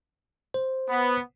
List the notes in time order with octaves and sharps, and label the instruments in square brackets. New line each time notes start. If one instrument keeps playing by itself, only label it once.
[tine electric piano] C5
[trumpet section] B3